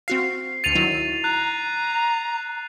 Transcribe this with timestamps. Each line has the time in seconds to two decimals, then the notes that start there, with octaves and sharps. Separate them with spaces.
0.08 C4 F#4 F5 C7
0.64 D2 A6 C#7 D#7 F7
0.75 D#3 F#3 E4
1.24 A#5 F#6